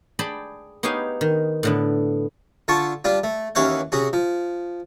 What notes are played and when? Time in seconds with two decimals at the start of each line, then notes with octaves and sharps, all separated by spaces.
0.19 G#4 D5 G5 A5 B5
0.83 B3 D#4 G4 C#5 F5 G#5
1.21 D#3
1.63 A2 D3 B3
2.68 D3 F4 A5 C#6
3.04 G3 D4 F4
3.24 A3
3.55 D#2 E3 C#4 C#5 F5 F#5
3.92 C3 C#4 F#4 G#4
4.13 F3